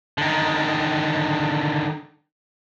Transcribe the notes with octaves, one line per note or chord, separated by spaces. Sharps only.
D3 D#3